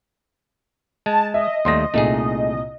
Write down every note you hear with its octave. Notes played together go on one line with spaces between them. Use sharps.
G#3 A5
D#5 E5
D#2 G3 A3 C6 D#6 A#6
C2 A#2 A3 D#4 G#4